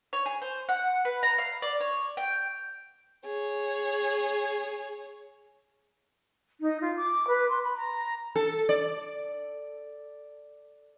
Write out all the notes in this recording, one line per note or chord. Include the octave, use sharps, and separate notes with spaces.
C#5
G#4
C5
F#5
B4
A#5
F5
D5
C#5
G5
G#4 C#5
D#4
F4
D6
B4
C6
B5
A#5
A4
D5